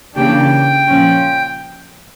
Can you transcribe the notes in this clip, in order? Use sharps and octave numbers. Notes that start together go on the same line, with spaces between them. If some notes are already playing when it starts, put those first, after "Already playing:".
C#3 E3 A#3 D4 G4 G5
A#2 F3 C#4